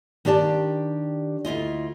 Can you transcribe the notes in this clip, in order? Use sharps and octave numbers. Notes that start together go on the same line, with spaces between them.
D#3 D4 G4 D5 A5
D2 E4 F4 D#5